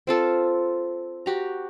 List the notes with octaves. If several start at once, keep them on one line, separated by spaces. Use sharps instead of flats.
C4 F4 A4
F#4 G4 A#5